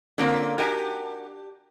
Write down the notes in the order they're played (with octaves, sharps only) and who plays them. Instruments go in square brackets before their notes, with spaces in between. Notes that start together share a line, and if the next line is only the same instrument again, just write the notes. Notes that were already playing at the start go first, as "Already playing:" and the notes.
[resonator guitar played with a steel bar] D3 A#3 C4 [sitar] C#4 F4 A#4
[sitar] D4 G4 [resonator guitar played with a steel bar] F#4 A#4 G#5